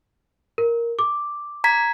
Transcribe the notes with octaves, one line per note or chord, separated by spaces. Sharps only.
A#4
D6
A#5 G#6 B6